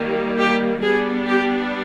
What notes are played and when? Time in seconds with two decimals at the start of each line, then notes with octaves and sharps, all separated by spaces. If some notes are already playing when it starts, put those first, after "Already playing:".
Already playing: D#3 G3 A#3
0.38 G4
0.82 G3 B3 D4 G#4
1.27 G4